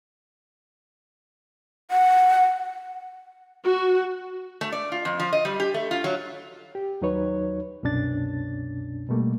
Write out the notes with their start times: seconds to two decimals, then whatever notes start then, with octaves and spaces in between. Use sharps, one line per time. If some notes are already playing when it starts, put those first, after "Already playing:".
1.91 F#5
3.64 F#4
4.61 A3
4.72 D5
4.92 F4
5.05 F2
5.20 F3
5.33 D#5
5.45 G3
5.60 G4
5.74 A3
5.91 F4
6.04 F#3
6.75 G4
7.01 D#2 F#3 D#4 B4 C#5
7.83 C2 F#2 B2 C#4 D4 A6
9.09 B2 G3 A3 A#3